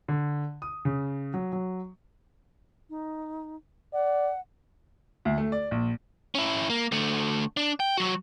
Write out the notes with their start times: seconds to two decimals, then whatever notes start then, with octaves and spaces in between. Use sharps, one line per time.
0.08 D3
0.62 D#6
0.85 C#3
1.34 F#3
1.53 F#3
2.90 D#4
3.94 D5 F#5
5.25 D2
5.38 A3
5.52 D5
5.71 A#1
6.35 C#4 E4
6.70 A#3
6.92 D3 A3
7.57 D4
7.80 G5
7.97 F#3 F#4